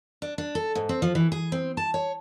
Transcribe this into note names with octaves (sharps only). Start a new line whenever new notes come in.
D4
D4
A4
G#2
C4
F3
E3
G#4
C4
A5
C#5